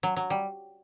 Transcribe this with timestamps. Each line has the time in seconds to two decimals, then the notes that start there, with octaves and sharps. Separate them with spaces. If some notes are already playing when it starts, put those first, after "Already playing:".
0.03 F#3
0.16 F#3
0.30 G3